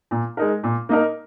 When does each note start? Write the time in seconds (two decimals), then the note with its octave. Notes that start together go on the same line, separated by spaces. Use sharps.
0.11 A#2
0.37 G#3 D#4 A#4
0.64 A#2
0.89 A#3 D#4 A#4